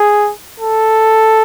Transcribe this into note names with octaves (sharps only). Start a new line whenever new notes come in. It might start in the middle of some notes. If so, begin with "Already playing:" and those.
Already playing: G#4
A4